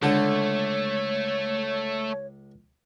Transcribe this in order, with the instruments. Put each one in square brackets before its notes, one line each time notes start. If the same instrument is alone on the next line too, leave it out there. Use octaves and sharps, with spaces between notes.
[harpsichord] C#2 A4 C6 [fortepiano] D3 [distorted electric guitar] A3 [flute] C#5